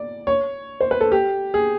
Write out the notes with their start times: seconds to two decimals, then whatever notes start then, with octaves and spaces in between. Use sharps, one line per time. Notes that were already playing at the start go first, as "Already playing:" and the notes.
Already playing: D5
0.27 C#5
0.81 C5
0.91 B4
1.01 A4
1.12 G4
1.54 G#4